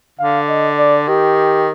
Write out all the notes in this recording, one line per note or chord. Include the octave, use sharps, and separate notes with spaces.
D3 F5
D#5
D5
D#3 G4